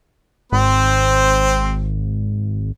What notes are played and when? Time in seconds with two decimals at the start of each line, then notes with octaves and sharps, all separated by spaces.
0.52 G#1 C4 C5